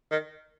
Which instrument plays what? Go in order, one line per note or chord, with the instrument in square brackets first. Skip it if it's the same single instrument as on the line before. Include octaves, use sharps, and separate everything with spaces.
[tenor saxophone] D#3